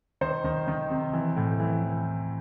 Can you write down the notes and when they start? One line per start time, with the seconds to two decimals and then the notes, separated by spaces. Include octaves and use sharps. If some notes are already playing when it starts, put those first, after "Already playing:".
0.21 D#3 C5
0.44 D#3
0.68 D#3
0.90 C3
1.13 E3
1.37 A2
1.60 E3
1.83 E3